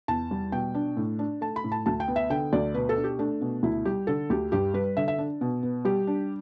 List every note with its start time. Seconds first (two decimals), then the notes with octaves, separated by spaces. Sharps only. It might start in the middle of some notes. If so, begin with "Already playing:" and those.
0.08 E2 A5
0.31 G3
0.52 B2 G5
0.75 D4
0.97 A2
1.19 D4
1.41 A3 A5
1.56 B5
1.64 A2
1.72 A5
1.86 D2 A5
2.00 G5
2.08 B3
2.16 E5
2.30 D3 G5
2.53 D2 D5
2.74 B2 B4
2.89 A4
2.97 D4
3.04 G4
3.19 A3 D4
3.41 B2
3.63 D2 E4
3.85 G3 G4
4.07 D3 A4
4.30 D2 G4
4.52 G2 G4
4.74 G3 B4
4.97 D3 E5
5.08 E5
5.18 D4
5.41 B2
5.63 B3
5.85 G3 G4
6.07 D4